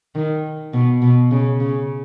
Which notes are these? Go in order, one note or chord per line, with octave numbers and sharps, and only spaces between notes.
D#3
B2
B2
C#3
C#3